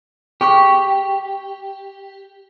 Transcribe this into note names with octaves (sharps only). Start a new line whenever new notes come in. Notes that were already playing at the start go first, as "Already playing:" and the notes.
G4 G#4 C#6 D6